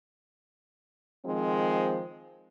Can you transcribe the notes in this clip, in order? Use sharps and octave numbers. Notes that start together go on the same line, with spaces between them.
D#3 F3 G#3 C4